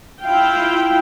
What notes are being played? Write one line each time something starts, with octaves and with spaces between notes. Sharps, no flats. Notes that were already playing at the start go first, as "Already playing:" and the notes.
E4 F4 F5 G5